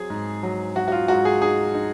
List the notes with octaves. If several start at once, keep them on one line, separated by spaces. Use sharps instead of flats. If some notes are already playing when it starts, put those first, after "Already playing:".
Already playing: F#3 C4 G#4
G#2
F#3
F#3 F#4
F#4
F4
G#2 F#4
G#4
D#4 G#4
D#4